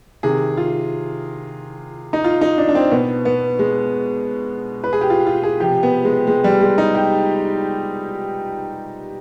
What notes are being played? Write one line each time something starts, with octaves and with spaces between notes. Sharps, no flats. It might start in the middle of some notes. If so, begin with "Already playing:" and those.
C3 D#3 G#4
F4
D#4
F4
D#4
D4
D4
C4
B2 B3
B3
G#3
B4
G#4
G4
F4
F4
G#4
C3 F3 G4
B3
G#3
G#3
G3
G#3
D#4
G4